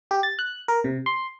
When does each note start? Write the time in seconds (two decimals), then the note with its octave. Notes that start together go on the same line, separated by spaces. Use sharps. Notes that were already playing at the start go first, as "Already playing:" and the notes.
0.11 G4
0.23 A6
0.39 F#6
0.68 A#4
0.84 C3
1.06 C6